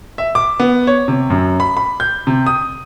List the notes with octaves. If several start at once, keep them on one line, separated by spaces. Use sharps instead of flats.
E5
D6
B3
C#5
C3
F#2
B5
B5
G6
C3
D#6